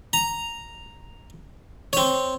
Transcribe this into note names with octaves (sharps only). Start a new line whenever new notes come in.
A#5
C4 C#5